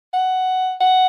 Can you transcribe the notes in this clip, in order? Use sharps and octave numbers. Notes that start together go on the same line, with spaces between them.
F#5
F#5